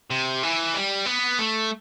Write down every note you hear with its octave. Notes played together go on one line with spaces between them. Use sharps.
C3
E3
G3
B3
A3